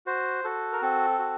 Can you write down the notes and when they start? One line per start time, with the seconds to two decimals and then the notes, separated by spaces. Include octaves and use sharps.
0.06 F#4 C5
0.44 F#4 A4
0.73 A#4
0.82 C4 A4
1.19 F#4